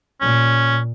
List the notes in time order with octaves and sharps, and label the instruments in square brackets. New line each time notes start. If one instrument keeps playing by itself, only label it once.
[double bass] A#2 [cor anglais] C#4